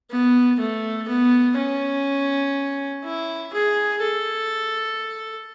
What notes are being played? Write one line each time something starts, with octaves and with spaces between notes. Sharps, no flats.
B3
A3
B3
C#4
E4
G#4
A4